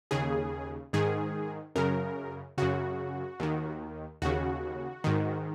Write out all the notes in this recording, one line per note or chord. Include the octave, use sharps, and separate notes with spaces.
D#2 C#3 G#4
G#2 D#3 G#4
F#2 C#3 A#4
F#2 C#3 F#4
D#2 D#3
D#2 C#3 F#4
G#2 D#3